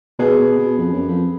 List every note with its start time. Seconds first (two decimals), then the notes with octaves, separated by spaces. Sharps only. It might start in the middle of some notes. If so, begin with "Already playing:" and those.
0.19 B2 G#4 B4
0.39 B2
0.59 B2
0.78 F2
0.93 F#2
1.08 F2